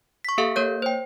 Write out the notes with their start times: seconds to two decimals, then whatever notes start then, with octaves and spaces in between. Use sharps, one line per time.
0.25 C#6 B6
0.38 A#3 G4 A4 E5 F5
0.56 A#3 A#4 C#5 G6
0.82 C5 G5